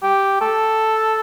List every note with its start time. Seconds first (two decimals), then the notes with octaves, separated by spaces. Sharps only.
0.03 G4
0.41 A4